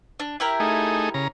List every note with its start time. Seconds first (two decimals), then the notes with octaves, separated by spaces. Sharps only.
0.20 D4
0.40 E4 G4 A#4
0.60 A3 D#4 G#4
1.14 C#3 A#5